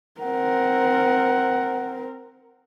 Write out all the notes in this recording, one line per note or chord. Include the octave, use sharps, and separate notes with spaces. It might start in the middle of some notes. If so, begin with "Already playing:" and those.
C4 A#4 F#5